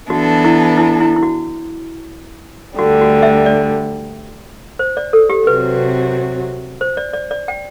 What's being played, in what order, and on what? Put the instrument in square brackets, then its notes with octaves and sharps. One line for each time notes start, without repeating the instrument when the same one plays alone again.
[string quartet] E3 B3 D4 A4 [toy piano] F#4
[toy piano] E4
E4
E4
E4
F#4
[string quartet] D2 D3 G3 [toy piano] F#4
[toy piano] F#4
E5
D5
C5
D5
A4
G4
[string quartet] C3 F#3 C4 F#4 [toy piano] B4
[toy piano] C5
D5
D5
D5
G5